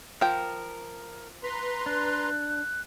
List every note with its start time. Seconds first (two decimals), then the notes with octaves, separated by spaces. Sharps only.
0.21 F3 A#4 G5
1.43 B4 A#5 C6 B6
1.86 D4 F#6